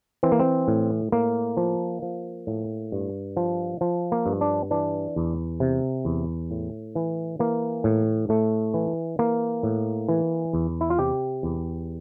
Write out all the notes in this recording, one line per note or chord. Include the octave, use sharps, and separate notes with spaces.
E3 C4
A#3
C4
A2
A2 A#3
F3
F3
A2
G2
F3
F3
A#3
G2
D4
E3 D4
E2
C3
E2
A2
E3
E3 A#3
A2
A2 A3
E3
E3 A#3
A2
E3
E2
E4
F4
C3 G4
E2